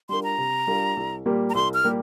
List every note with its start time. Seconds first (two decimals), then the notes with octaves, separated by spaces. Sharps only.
0.09 G3 D4 F4 A#4 C6
0.24 A#5
0.38 C3
0.67 G3 D4 F4 A#4
0.97 C2
1.26 A#2 G3 A#3 G4
1.50 A#5
1.55 C2 C6
1.74 F6
1.84 A#2 G3 A#3 G4